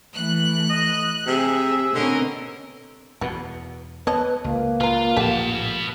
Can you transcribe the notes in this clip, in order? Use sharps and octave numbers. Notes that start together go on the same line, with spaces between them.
E3 A3 F#6
D#5
C3 G#4 E5
B2 D3 C4 C#4 A#4 D#5
E2 B2 F#4 B4
B3 B4 C#5 D#5 A5
C#2 A#3
F4 B4 A#5
A#1 G4 A4 B4 F#5 A5